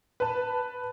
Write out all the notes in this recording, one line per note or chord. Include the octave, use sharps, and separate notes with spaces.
B4 A5